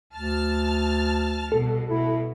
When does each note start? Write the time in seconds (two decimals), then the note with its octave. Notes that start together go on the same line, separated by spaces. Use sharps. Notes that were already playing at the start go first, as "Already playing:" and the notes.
0.14 D2 A5 F6
1.52 C2 B2 A4
1.90 B2 E4